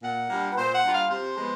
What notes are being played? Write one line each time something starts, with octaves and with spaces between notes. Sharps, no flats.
A#2 F#5
G3 A#3 D4 F4
B4
A#2 C5
F#5
G3 A#3 D4 F4
F5
C3 C5
F3 G#3 B3